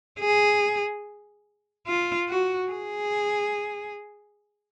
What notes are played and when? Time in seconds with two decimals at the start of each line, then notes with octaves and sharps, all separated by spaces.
0.21 G#4
1.87 F4
2.29 F#4
2.71 G#4